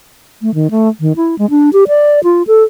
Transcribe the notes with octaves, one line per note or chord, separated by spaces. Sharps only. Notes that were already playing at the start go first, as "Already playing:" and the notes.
A3
D#3
A3
D#3
E4
G#3
D4
G4
D5
F4
A4